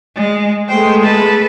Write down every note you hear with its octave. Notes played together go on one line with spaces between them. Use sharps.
G#3
G#3 A3 B3 C5 G5
A4 B4